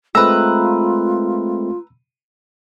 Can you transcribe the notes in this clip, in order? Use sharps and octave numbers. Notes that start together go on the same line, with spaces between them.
G#3 A3 C4 F4 B4 A#5 E6